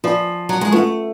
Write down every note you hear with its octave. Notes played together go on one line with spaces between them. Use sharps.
F3 F4 B4 D5 G#5 B5
F#3
G#3
A3 C#4 F4 B4 F#5 C#6